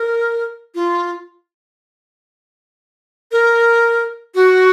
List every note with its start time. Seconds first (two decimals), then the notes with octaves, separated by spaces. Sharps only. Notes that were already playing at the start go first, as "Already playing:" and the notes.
Already playing: A#4
0.75 F4
3.32 A#4
4.35 F#4